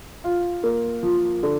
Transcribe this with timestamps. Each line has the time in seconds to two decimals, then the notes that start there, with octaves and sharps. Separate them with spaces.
0.24 F4
0.64 A#3
1.03 F3
1.43 D3